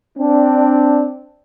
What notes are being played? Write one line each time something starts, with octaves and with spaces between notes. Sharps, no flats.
C4 D4